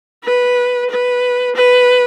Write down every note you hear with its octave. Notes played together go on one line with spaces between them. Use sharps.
B4
B4
B4